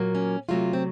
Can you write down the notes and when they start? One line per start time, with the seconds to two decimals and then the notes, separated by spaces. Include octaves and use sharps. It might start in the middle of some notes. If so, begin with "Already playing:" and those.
Already playing: A#2 F#3 A#3
0.15 C#4
0.49 C3 F#3 A3 F4
0.73 C4